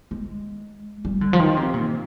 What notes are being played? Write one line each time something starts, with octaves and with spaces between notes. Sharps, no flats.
G#3
G3
D3
F3
D#3
C3
A#2